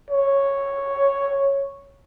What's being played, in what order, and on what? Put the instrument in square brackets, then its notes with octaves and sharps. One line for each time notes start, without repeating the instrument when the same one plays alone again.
[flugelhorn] C#5